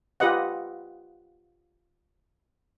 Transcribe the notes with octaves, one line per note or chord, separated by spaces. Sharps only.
F4 G4 B4 D#5 F#5